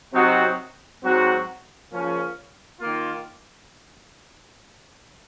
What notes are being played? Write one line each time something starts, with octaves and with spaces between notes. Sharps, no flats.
C3 F#3 C4 D#4 F#4
G#2 F#3 C4 F#4
C#3 F3 A#3 C#4
D#3 A#3 F4